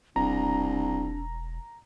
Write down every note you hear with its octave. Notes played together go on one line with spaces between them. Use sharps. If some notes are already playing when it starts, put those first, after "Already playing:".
E1 C2 D4 A#5